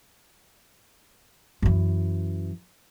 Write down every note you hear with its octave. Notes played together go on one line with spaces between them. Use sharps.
F#2 E3